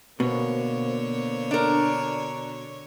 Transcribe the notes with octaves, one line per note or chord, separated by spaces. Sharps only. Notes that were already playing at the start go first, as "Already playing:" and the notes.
B2 D3 A#3 C5 C#5
D4 A#4